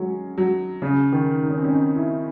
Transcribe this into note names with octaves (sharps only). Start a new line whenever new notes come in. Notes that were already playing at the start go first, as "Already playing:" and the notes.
Already playing: F#3 G#3 C#4
F#3
C#3
D#3
D#4
C#4
C4
C#4
D#4
E4